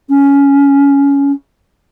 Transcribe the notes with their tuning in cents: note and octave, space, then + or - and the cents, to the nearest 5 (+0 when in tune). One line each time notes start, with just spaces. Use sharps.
C#4 +15